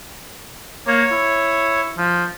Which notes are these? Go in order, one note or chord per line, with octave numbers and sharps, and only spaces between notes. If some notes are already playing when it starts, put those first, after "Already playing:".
A#3 C#5
E4
F3